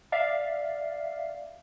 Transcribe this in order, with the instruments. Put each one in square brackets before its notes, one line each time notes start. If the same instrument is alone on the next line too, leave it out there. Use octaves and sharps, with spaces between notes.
[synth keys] D5 E5 F5